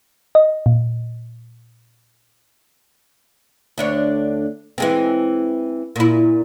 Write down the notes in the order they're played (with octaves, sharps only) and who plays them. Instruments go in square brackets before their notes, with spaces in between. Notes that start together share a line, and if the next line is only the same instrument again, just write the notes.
[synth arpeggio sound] D#5
A#2
[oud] D2 D4 C#5
E3 G#3 C4
A#2 E4